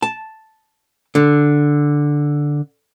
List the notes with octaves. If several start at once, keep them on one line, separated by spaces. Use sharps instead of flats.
A5
D3